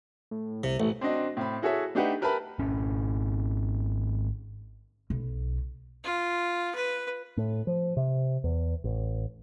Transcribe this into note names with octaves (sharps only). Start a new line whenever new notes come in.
A2
C2 C3
A1 A3
C4 D4 F#4 D#5
A2 C4 B5
E4 F#4 G#4 A4 C#5 E5
A3 D4 D#4 G4 B4 F#5
G4 A#4 B4 E5 A5 B5
G#1 C#4
B1
F4
B4
A2
F3
C3
E2
A1